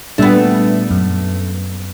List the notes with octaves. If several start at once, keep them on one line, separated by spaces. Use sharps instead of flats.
A#2 G3 A3 B3 D4
F#2